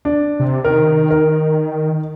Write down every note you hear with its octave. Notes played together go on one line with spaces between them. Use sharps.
D4
C3
D#3 A#4
A#4